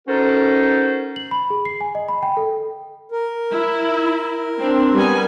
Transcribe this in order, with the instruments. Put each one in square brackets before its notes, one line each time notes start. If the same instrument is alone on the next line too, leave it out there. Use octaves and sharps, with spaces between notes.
[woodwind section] C#4 D#4 F#4 A4 A#4 C5
[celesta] F#7
B5
G#4
C7
G#5
D#5
B5
G5
A4
[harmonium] A#4
[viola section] E4
C4 D4
G3 B3 G#5